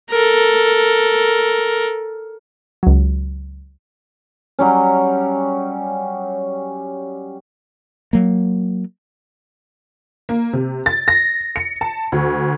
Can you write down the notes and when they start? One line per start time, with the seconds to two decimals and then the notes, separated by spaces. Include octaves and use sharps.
0.10 A4 A#4
2.83 C#2 F#3
4.59 F#3 G3 C#4
8.13 F#3 A#3
10.29 A#3
10.53 C3
10.86 A6
11.08 A#6
11.56 C#7
11.81 A5
12.12 D2